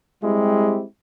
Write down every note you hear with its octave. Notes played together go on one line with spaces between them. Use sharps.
G3 G#3 C4 E4 G4